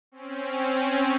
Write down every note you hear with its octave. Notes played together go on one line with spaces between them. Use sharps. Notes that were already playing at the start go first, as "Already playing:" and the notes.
C4 C#4